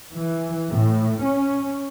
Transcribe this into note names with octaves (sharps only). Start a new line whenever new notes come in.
E3
A2
C#4